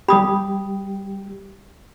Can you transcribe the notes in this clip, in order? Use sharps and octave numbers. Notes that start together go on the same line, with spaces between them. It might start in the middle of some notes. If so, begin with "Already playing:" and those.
G3 G4 B5 D#6